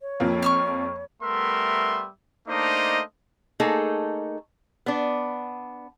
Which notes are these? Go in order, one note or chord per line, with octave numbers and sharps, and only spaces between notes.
C#5
F2 F3 A#3
C#6 E6 F6
G3 A3 B3 A#4 E5 C6
A3 A#3 D4 D#4 C5 D#5
A3 A#3 D#4 G#4 A4
B3 D4